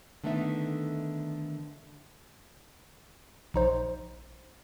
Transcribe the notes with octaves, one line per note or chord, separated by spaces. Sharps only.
D3 D#3 A3 B3 D#4 E5
A#1 D#4 C5